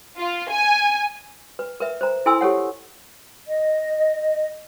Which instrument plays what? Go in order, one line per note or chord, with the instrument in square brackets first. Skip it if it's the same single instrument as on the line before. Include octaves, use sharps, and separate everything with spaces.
[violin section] F4
G#5
[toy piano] B4
A#4 B4 E5
C5 A#5
E4 A4 G#5 C6 E6
G4 A4 C#5 F#5
[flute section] D#5